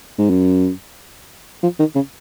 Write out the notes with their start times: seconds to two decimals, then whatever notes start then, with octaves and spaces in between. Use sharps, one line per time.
0.18 G#2
0.30 F#2
1.63 F3
1.79 D#3
1.95 C#3